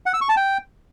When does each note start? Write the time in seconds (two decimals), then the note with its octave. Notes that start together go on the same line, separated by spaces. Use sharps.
0.06 F#5
0.14 E6
0.21 C#6
0.29 A5
0.37 G5